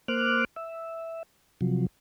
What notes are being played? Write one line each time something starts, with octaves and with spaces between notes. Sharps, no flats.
A#3 C5 D6 F6 F#6
E5
C3 F3 F#3